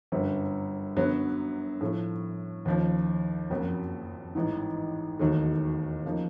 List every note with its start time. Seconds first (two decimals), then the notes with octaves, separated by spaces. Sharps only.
0.12 G1 F#2 D3
0.96 F#2 D3 F#3 B3
1.81 A2 F3 A3
2.65 D#2 C#3 F3
3.50 F#1 F2 C#3 F#3 A#3
4.35 A1 G#2 E3
5.19 E1 D#2 D#3 F#3 A3
6.05 C#3 F3 A#3 D#4